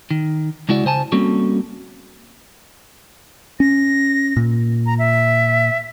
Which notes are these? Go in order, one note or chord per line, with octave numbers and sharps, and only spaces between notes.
D#3
C#2 G#3 E4 F#4 D5
C#3 C5 G#5 A5
G3 A#3 C4 C#4 F#4 A4
C#4 A#6
A#2
A#5
E5